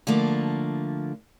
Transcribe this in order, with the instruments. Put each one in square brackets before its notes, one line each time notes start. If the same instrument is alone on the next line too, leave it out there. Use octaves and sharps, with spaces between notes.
[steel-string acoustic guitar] D3 F3 A3 A#3